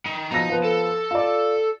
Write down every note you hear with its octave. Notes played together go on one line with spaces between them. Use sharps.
D#3
B2 F3 D#4 A#5 A#6
F3 B3 C5
A4
F4 D5